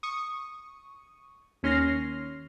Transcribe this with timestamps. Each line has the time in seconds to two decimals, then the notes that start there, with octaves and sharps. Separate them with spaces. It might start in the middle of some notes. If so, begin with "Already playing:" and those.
0.03 C#6 D#6
1.63 D#2 C#4 C6 F6 A#6 C7